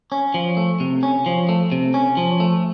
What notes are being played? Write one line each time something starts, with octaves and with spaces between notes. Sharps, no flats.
C#4
F3
A3
C3
C#4
F3
A3
C3
C#4
F3
A3